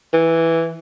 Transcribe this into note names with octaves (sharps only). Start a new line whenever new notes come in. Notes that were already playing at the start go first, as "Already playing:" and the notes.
E3